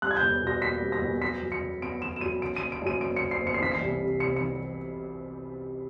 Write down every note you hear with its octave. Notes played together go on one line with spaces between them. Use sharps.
G3 F#6
G#6
G6
E2
B2
A#6
A#3 B6
G3
A#6
E2
F#3 B6
F#2
C#7
C#3
B3 D7
F#3 E7
E7
F#2 D#7
C#3 D7
D#7
F#1
D7
F#2 D#7
F#1 D7
C#3 C#7
C7
F#1
C#7
C7
E3 B6
C7
C2
C3
C2 C#7
E3 C#7